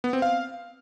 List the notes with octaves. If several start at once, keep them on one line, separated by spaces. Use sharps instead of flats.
B3
C4
F5